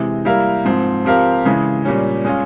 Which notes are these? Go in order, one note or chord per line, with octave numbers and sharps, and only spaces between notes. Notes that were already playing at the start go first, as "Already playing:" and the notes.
Already playing: C3 E3 G#3
G3 A#3 E4 A#4 F5
G#2 F3 C4
F3 C4 G4 A#4 F5
C#3 E3 G#3
A#2 G3 C#4
G#3 C#4 F4